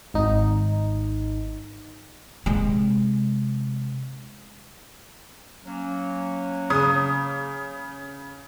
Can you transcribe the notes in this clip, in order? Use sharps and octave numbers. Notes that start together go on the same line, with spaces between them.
G#1 D#4
C3 G#3
F#3 A#3 C#4
C#3 D#6